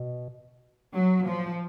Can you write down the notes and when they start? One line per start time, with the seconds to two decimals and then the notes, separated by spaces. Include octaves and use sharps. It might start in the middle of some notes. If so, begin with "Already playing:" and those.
Already playing: B2
0.93 F#3
1.26 F3